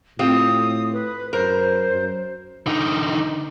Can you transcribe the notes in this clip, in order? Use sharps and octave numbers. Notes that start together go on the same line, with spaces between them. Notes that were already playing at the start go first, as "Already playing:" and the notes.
A2 C4 F4 G4 D#6
B4
F#2 A#4 C5
F#2
D3 D#4